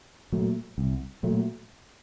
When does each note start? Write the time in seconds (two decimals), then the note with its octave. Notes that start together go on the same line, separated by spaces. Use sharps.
0.32 A#2 F#3 A3
0.78 C2
1.23 A#2 F#3 A3